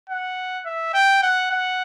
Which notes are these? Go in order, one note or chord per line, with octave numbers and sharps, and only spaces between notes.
F#5
E5
G5
F#5
F#5